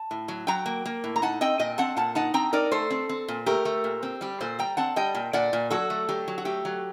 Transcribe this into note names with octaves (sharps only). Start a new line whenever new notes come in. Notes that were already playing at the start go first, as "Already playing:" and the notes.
Already playing: A5
A2
F#3
F#3 G5 A#5
A#3
A#3
A2
A#5
D#4 F#5 A5
C4 D#5 G5
A#2 D#5 G5
C4 F#5 A5
A#2 F#5 A5
D#4 F#5 A5
C4 G5 A#5
D#4 A#4 D5
A3 A4 C5
C4
C4
A#2
A3 G4 A#4
A3
A#2
C4
G3 G4
A#2 A4 C5
G3 G5 A#5
C4 F#5 A5
G3 D#5 G5
A#2
A#2 D5 F#5
A#2
F#3 F#4 A4
A3
F#3 G4
F#3
F#4
A3 G4
F#3